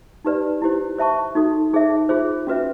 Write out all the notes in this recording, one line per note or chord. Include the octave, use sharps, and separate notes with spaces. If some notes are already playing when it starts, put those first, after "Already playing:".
D#4 G4 B4 D5
E4 G4 C5
C5 E5 A5 C#6
D#4 F#4 A4
D#4 G#4 C5 E5
F4 G#4 C5
C#4 F#4 B4 E5